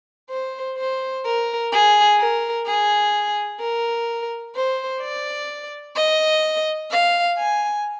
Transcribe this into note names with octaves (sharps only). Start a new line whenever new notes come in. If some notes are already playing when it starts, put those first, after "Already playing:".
C5
C5
A#4
G#4
A#4
G#4
A#4
C5
D5
D#5
F5
G#5